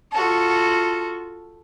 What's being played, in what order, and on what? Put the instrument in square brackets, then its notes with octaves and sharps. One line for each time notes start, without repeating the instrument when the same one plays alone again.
[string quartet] F4 F#4 A4